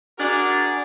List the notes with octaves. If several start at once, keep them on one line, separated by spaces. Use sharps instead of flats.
D4 F#4 G#4 A#4 D5